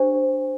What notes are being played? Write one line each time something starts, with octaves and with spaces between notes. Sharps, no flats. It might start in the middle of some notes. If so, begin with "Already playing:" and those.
Already playing: D4 G4 C5